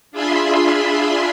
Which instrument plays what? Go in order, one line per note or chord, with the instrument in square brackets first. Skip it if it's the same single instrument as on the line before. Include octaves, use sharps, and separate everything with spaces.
[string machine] D4 F4 G#4 E5 B5 C6